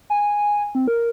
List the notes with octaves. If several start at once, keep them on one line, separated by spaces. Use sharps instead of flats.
G#5
C4
A#4